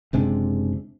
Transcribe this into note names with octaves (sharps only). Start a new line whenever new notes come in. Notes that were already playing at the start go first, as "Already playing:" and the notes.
F#1 C3 G#3 D4